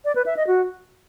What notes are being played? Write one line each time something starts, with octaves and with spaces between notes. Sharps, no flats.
D5
B4
E5
D#5
F#4